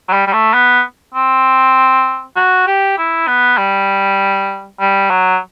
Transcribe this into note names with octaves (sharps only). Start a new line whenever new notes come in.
F#3
G3
G3
A3
B3
C4
F#4
G4
E4
B3
G3
G3
F#3